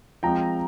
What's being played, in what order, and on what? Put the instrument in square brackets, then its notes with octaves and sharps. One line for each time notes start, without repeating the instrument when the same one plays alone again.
[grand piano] F3 G#3 C4 G5 A#5